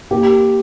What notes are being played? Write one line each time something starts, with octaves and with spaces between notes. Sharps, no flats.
A#3 G4